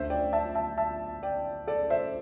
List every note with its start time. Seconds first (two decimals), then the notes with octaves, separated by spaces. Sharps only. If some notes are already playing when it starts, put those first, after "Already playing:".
Already playing: D2 D3 A3 C5 E5
0.10 D5 G5
0.33 E5 A5
0.55 E5 A5
0.78 E5 A5
1.23 D5 G5
1.67 A4 D5
1.90 C5 E5